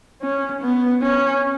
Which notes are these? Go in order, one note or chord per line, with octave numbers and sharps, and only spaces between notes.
C#4
B3
C#4